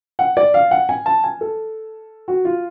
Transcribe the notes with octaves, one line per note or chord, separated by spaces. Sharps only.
F#5
D5
F5
F#5
G#5
A5
G#5
A4
F#4
F4